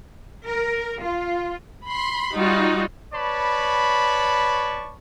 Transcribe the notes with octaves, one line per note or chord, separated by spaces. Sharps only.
A#4
F4
B5 C6
G3 D#4 F4 F#4
B4 C#5 D5 A5 B5 C#6